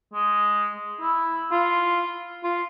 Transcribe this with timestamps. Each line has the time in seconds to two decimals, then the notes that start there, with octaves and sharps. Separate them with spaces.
0.13 G#3
1.01 E4
1.52 F4
2.44 F4